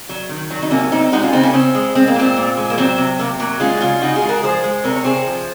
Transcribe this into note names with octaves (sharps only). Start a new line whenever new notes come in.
F#3
D#3
F#3
D#4
C3 A#3 C#4
C3 C4 D#4
G#3 D#4 F#4
C#4 F4
C#3 C4 D#4
A#3 C#4
C#3 C4
G#3
G#3 C4
A#3
A#2 C4
A#2
G#3
A#3
F#3 C4
C3
C3 A#3
F#3 A#3
G#3 C#4 F4
F#4
C#3 C#4 F4
C#3 D#4 F#4
F4 G#4
G#3
F#4 A#4
F3 G#4 C5
G#3
C3 A#4 C#5
C#5
C3 G#4 C5
F3